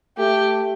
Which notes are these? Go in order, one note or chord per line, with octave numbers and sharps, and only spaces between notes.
A3 G4